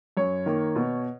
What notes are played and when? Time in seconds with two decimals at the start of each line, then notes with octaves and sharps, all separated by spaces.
0.17 F#2 C#5
0.46 D#3 A#3
0.76 B2